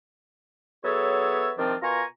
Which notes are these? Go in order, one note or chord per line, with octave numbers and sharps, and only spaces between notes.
F#3 B3 G#4 A4 C#5 E5
C3 D#3 F3 C4 D4 F4
B2 F4 A#4 G#5 A#5 C#6